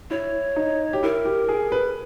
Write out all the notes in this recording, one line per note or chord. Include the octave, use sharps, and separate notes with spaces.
E4 C#5
D#4
G4
E4 A#4
G4
G#4
B4